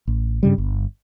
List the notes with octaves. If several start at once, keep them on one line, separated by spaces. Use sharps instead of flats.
A1
G2 C#3 G3
G1